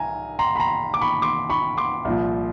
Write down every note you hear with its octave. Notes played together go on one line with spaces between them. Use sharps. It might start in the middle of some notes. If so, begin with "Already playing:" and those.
Already playing: C2 G#5 A#5
A#5 C6
B5
A#5 C6
D6
B5 C#6
C6 D6
B5 C#6
C6 D6
C2 A#2 F3